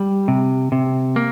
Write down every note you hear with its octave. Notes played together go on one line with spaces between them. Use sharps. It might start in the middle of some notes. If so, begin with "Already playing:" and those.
Already playing: G3
C3
C3
A#3